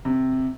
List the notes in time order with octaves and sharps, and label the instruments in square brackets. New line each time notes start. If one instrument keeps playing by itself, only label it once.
[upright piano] C3